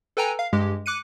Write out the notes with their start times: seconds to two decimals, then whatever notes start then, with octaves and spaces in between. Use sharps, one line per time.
0.17 A4 B4 G5 G#5 A#5
0.39 F5
0.53 G2 G#3 G4
0.86 D6 F#6 C#7 D#7